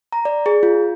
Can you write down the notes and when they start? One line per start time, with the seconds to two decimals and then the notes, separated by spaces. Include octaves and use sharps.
0.12 A#5
0.25 D5
0.46 G#4
0.63 F4